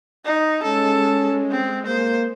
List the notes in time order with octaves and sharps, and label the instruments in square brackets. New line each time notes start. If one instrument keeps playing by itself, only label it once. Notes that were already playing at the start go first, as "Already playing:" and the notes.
[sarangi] D#4
[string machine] G#3 [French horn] C#4 [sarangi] A4
[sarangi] C4
[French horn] A#3 [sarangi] C5